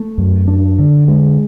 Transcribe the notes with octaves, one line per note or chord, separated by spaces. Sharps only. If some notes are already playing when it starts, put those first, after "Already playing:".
Already playing: A3
F#2
D4
D3
G#3